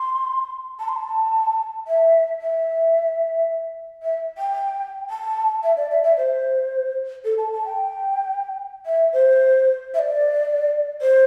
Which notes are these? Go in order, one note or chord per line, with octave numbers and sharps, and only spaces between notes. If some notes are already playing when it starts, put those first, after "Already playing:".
Already playing: C6
A5
C6
A5
E5
E5
E5
G5
A5
E5
D5
E5
E5
C5
A4
A5
A5
G5
E5
C5
E5
D5
C5